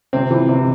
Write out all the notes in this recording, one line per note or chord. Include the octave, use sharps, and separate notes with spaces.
C3 C4
E3
C3